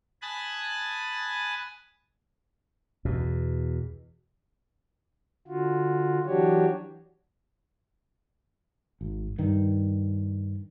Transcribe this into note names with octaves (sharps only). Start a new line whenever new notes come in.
G#5 A5 B5 D#6 F#6 A6
E2 B2
D3 F4 F#4
E3 F#3 D4 F#4 G4 C#5
G#1
G2 D#3